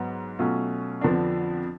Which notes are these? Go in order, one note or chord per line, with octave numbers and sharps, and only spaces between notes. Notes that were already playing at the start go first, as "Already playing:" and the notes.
Already playing: G#2 F#3 B3
B2 F#3 A3 C#4 F4
F2 D3 F3 B3 D4